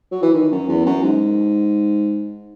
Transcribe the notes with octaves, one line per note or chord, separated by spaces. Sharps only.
F#3
E3
D#3
F#2
E2
F#2
G#2